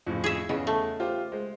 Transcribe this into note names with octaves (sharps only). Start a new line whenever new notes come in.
F2 A2 C#3
G#4 E5
E2 C#3 D#5
A3
F4 G4 C5
G#3 C5